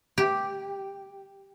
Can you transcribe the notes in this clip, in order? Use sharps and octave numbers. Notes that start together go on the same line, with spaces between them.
G4